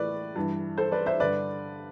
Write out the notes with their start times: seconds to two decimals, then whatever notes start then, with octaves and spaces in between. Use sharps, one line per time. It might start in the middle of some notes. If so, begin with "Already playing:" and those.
Already playing: A2 E3 B4 D5
0.36 G2 E3
0.78 A4 C5
0.92 B4 D5
1.06 C5 E5
1.20 G2 D3 B4 D5